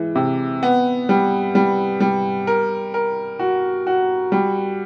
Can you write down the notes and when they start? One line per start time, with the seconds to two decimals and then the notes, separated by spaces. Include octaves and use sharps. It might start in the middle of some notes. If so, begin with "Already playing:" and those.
Already playing: E3 G#3
0.15 C3
0.63 B3
1.09 G3
1.55 G3
2.00 G3
2.47 A#4
2.94 A#4
3.39 F#4
3.87 F#4
4.32 G3